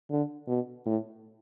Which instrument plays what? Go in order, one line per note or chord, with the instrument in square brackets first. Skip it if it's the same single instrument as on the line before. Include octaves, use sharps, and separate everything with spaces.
[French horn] D3
B2
A2